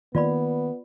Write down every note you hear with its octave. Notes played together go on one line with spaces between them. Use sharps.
D#3 A#3 B3 F4 D5 B5